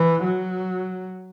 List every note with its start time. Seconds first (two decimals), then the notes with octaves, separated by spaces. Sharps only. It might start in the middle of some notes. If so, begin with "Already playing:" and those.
Already playing: E3
0.23 F#3